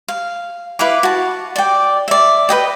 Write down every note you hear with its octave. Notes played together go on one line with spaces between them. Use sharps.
F5
E4 B4 F5 D6
F#4 A5
D5 G5
D5 E5
B4 D#5 G5